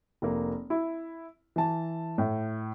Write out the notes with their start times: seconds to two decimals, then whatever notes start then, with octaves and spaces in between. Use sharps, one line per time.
0.22 F1 A#3
0.70 E4
1.56 E3 A5
2.18 A2